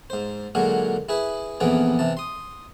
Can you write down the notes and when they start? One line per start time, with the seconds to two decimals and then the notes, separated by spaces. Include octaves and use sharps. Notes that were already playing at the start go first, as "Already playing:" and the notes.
0.10 G#2 C5
0.55 A#2 D3 F#3 G#3 F#4
1.09 E4 G#4 B4
1.60 A#1 F2 E3 B3 G#4 D6
1.99 C3 E3 A5
2.17 C6 D#6